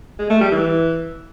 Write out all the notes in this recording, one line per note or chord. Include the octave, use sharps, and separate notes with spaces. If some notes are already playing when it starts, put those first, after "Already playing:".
G#3
A3
G3
E3